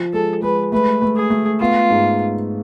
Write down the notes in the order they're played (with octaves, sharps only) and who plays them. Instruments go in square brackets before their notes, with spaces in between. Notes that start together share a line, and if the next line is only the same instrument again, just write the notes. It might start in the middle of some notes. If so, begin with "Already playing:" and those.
Already playing: [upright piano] F3
[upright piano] G#3 [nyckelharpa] A4
[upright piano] G#3 [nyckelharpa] B4
[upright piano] A3 [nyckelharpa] B4
[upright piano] A3
[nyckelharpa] G#4
[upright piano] A3
[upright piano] B3 [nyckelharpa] F4
[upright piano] G#2